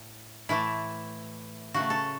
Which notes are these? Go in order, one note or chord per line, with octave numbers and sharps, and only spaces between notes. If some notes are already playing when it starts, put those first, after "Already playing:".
Already playing: A2
A2 E3 A3 E4
C#3 F#3 A3 F#4
A4